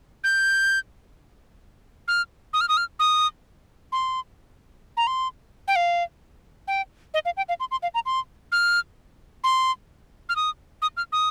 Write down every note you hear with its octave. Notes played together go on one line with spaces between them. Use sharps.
G6
F6
D#6
F6
D#6
F6
D#6
C6
A#5
C6
G5
F5
G5
D#5
F5
G5
F5
C6
C6
F5
A#5
C6
F6
C6
F6
D#6
D#6
F6
D#6